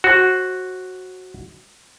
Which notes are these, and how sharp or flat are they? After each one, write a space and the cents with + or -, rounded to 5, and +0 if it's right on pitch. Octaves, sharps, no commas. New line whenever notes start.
F#4 +0 C5 +35